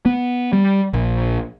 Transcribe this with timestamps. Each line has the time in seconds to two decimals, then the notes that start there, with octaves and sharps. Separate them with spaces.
0.06 B3
0.53 G3
0.93 A#1